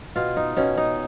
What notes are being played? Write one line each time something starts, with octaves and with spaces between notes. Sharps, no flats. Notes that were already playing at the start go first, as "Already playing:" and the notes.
B2 F4
D#4
B2 C#4
D#4